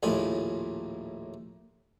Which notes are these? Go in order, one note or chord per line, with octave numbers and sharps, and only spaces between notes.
A#1 D#2 A2 F4 G#5 B5